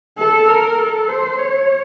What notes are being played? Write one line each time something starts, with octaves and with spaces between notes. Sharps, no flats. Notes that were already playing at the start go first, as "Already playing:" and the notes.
A4
A#4
A4
C5
C#5